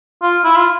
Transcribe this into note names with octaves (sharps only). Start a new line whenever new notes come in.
F4
E4
F4